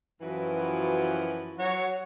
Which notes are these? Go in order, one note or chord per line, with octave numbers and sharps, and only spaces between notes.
F#2 E3 F3 E4 F#4 B4
F#3 F#4 C#5